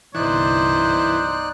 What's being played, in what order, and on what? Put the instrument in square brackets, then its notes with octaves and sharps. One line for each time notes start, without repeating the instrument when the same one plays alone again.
[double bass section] G1 C2 [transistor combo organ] E3 [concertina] D#4 D5 F#6 [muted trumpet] C5